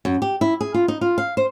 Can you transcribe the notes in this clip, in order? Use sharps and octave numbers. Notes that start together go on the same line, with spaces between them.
F#2
G4
E4
G#4
F4
D#4
F4
F5
C5